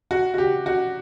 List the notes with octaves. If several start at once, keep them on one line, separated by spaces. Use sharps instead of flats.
F#4
F#4
G4
F#4